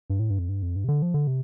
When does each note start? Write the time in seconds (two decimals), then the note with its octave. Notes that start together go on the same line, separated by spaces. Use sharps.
0.10 G2
0.19 A2
0.30 G2
0.39 F2
0.49 G2
0.62 F2
0.76 G2
0.84 C3
0.88 D3
1.02 F3
1.14 D3
1.27 C3